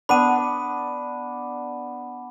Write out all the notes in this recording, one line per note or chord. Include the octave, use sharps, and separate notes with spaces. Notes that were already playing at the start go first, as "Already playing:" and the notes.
B3 D4 B5 D#7